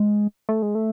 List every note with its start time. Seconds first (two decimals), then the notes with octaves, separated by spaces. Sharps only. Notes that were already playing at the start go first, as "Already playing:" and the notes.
Already playing: G#3
0.49 A3
0.62 G#3
0.75 A3